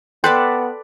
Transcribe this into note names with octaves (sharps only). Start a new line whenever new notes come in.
B3 A4 B4 D5 G5 C6 F#6